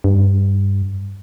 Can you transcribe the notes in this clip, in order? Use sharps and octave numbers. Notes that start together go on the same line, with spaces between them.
G2